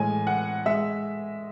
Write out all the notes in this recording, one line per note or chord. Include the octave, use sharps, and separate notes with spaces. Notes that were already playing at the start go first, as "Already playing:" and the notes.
Already playing: A2 E3 G#3 G#5
F#5
G#3 E5